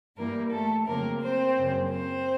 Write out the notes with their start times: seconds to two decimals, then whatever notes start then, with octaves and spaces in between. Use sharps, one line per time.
0.17 G2 E3 G3 A#3 A#4
0.52 A3 A4
0.87 F2 C#3 F#3 A3 A#3 C4 A#4
1.21 C4 C5
1.57 F#2 C#3 F#3 A#3
1.91 C4 C5